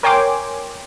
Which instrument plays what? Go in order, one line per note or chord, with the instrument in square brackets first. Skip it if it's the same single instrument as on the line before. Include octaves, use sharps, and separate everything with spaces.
[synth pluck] A#4 C#5 G5 G#5 C6 D6